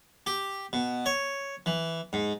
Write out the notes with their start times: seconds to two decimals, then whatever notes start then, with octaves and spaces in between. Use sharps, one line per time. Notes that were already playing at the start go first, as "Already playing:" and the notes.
0.26 G4
0.73 B2
1.06 C#5
1.66 E3
2.13 G#2